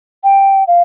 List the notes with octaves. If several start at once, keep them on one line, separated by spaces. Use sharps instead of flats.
G5
F5